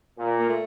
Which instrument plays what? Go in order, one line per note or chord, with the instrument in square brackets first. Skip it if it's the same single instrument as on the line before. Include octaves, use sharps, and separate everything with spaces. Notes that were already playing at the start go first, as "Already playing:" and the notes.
[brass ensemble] A#2
[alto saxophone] A#3
A3